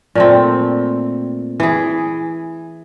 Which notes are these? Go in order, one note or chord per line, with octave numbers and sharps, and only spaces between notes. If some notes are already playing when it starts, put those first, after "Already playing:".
A#2 A3 C4
E3 G#4